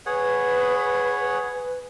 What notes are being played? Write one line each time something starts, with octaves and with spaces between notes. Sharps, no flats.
G#4 B4 C#5 F#5